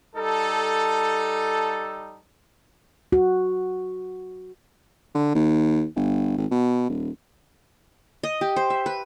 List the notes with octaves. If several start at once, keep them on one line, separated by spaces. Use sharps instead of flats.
G3 D#4 A4
F#4
D3
D#2
G1
G#1
B2
D#1
D#5
G4
C5
E5
B4